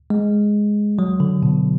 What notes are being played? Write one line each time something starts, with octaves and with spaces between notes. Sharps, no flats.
G#3
F#3
D3
B2